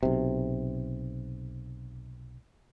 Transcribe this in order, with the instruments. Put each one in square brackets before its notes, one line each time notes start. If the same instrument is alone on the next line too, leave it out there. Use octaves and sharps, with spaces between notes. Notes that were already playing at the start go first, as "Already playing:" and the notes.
[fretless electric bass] B1 C3